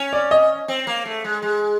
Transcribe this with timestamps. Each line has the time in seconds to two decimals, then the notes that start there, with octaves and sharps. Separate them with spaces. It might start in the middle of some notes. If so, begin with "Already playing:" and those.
Already playing: C#4
0.13 D5
0.31 D#5
0.68 C4
0.87 A#3
1.05 A3
1.24 G#3
1.42 G#3